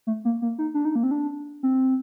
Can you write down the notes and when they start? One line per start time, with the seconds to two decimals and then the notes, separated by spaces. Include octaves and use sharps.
0.07 A3
0.25 A#3
0.42 A#3
0.58 D#4
0.74 D4
0.85 D#4
0.96 A#3
1.03 C4
1.11 D4
1.63 C4